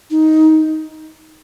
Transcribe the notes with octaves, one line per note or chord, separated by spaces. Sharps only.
D#4